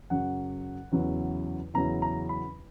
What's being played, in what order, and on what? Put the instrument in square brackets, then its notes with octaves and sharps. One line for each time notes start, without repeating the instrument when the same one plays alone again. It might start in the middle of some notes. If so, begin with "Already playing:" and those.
[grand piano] F#2 C#3 F#3 C#4 F#5
E2 C#3 F#3 C#4 E4
E2 C#3 F#3 C#4 E4 A#5
A#5
B5